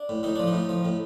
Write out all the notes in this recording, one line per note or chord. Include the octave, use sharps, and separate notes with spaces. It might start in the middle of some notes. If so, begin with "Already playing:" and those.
Already playing: D4
A2
A2 D#4
F3 D4
D#4
A2
F3
A2